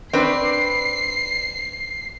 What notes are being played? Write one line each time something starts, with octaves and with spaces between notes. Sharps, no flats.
C4 D4 B4 C7